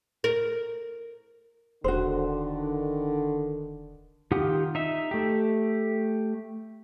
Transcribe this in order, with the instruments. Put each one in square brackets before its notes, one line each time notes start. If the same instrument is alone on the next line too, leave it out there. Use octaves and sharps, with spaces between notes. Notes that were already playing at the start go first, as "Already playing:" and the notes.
[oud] A#4
[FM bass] E1 [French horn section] D3 D#3 [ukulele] F#4 C5
[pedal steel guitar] D#3 F4 G4 F#5 D#6
D#4 E5
A3 G4